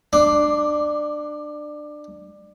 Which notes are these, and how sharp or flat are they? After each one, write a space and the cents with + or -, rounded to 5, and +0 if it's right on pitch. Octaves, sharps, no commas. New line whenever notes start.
D4 +20 D6 +0